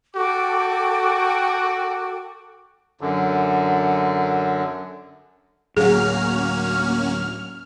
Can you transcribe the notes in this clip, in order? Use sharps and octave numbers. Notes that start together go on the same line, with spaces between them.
F#4 A4 G5 D6
F#2 D3
D2 A2 F#3 A#3 C#4 F#4 G#4 F6